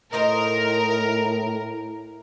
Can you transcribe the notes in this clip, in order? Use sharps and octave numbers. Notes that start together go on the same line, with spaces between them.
A2 D#4 A#4 C5 D#5